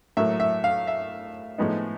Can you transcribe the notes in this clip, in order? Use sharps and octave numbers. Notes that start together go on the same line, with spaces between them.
A2 F#3 A#3 E5
E5
F5
E5
A2 F3 G#3 B3 D#4